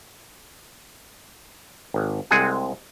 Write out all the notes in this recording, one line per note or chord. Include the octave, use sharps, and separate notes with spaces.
G#1
C2 G#3 C4 G#4 F#5 G#5